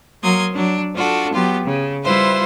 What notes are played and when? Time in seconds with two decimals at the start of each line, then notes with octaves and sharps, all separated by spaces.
0.22 F#3 A#3 A#4 C6 D#6 G#6
0.51 F#3 D4
0.93 D4 F4 F#4 A4
1.32 F#3 B3 F4 G4
1.64 C#3
2.02 G3 E4 F4 B4 C5 E5